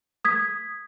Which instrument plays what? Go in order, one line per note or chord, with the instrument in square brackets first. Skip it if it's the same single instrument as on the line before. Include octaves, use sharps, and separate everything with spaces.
[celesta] D#6 G#6 B6